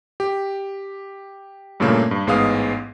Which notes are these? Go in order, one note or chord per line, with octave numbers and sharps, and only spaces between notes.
G4
G2 A#2 C#3 A3 A#3 C#4
G2
A1 G#2 G#3 B3 F5 D#6